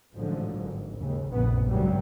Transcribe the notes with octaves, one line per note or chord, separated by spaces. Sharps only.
A1 G#2 D3 F3 F#3
G#1
D#2 G#2 C#3
F1 A#1 F#2 A#2 C#3 B3
G#1 G2 C#3 F#3 G3